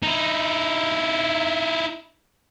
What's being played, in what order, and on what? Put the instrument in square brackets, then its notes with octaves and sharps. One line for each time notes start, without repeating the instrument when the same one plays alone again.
[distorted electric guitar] D#4 E4